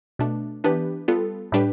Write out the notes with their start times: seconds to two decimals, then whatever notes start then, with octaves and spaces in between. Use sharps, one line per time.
0.19 B2 A3 D4
0.64 E3 B3 D4 G4 B4
1.08 G3 B3 F4 A4
1.52 A2 G3 D4 G4 B4